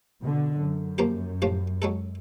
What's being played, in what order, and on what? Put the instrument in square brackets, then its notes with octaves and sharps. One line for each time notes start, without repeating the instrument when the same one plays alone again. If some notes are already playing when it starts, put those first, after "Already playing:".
[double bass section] B2 D3
F#2
[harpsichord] F3 A#3 G4
A2 F3 G4
F#3 G#3 A4